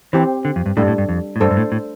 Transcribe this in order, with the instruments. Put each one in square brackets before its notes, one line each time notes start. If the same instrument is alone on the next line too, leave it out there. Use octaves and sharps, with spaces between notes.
[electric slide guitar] E3 [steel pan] C4 G4 C5
[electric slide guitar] D3
F2
G2
[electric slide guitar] A2 [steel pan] G3 D4 A4
[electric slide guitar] G2
A2
G2
F2
A2
[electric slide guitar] G2 [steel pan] A3 D4 A4 C5
[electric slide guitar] G2
A2
A2